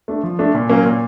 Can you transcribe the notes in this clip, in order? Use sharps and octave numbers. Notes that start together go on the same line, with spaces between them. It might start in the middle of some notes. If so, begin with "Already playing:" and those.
A3 D4
F3
A3 D4
A#2
F#3 A#3 C#4
A#2